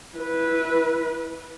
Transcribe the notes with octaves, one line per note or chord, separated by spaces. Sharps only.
E4 B4